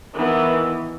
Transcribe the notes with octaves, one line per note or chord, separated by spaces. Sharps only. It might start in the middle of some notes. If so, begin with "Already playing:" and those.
D#3 E3 B3